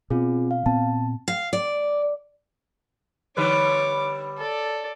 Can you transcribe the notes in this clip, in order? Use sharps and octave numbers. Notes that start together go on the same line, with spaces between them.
B2 C4 F4 G#4
F5
A#2 B3 C4 A5
F5
D5
D3 G3 B4 C#5 D6
A4 D5